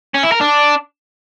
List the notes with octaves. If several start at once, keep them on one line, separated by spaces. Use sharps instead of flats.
C#4
E4
A#4
D4